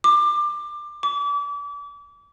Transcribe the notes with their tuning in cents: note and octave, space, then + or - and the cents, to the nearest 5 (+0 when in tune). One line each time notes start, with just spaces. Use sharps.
D6 +20
D6 -35